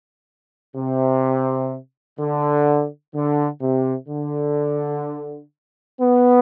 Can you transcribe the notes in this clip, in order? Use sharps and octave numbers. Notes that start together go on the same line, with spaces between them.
C3
D3
D3
C3
D3
B3